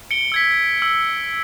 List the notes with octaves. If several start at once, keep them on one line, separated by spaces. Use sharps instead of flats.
C#7 D7 G7
E6 G#6 B6
E6